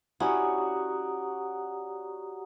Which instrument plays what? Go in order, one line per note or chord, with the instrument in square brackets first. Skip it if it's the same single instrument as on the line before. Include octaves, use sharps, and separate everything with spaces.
[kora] C#4 E4 [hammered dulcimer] F#4 C#5 D5 [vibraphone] G4 A#5 D#6